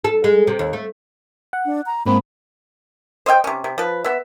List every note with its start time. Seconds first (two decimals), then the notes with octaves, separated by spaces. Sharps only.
0.04 A4
0.24 G#3
0.47 C3
0.59 D#2
0.73 A3
1.53 F#5
1.66 D4
1.86 A#5
2.06 G#2 A#3 C4 B5
3.26 C5 D#5 E5 G5
3.44 C3 C#4
3.64 C3
3.78 F3 B4
4.04 B3 E5